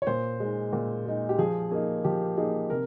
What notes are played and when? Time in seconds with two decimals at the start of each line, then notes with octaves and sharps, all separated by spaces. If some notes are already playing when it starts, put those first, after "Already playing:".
0.02 C#5
0.07 A#2 C5
0.40 G#3 D#4
0.73 A#2
1.06 G#3 D#4
1.29 G4
1.38 F3 G#4
1.71 A#3 D#4 G#4
2.04 F3 G4
2.37 A#3 D#4 G#4
2.70 C3 A#4